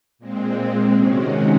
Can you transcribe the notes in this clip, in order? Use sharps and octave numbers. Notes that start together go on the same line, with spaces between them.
A#2 G#3 C4
C3 D#3 G#3 C#4 F#4